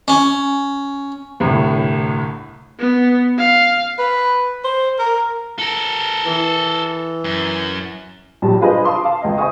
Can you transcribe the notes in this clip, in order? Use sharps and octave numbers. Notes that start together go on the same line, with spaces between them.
C#4
G1 C2 A2
B3
F5
B4
C5
A#4
A4 A#4
E3
F#2
A#1 G2 E3 F#3 G3 A5
D4 F4 G#4 B4 C5 D#5
F5 A5 C6 D6 D#6
F5 A5
C#2 D#5
C5 D#5 E5 G#5 C#6 D#6